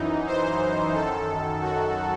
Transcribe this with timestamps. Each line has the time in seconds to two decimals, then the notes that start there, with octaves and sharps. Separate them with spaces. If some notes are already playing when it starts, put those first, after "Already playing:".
Already playing: F#2 E3 D#4
0.27 C5
0.93 F#2 D#3 A4
1.61 F#4